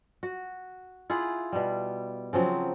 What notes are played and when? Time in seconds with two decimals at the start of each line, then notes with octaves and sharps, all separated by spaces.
0.23 F#4
1.10 E4 F4 G#4 F#5
1.53 B2 G3
2.33 C#3 F3 F#3 C4